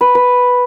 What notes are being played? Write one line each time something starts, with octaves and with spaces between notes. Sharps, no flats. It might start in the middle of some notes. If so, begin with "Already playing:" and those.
B4
B4